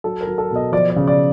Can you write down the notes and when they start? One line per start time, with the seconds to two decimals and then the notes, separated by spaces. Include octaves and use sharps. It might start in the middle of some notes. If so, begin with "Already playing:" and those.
0.04 F#3 A4
0.21 A#4
0.27 F#3
0.38 A4
0.51 B2
0.56 D#5
0.72 F3 D5
0.90 D5
0.96 C#3
1.07 D5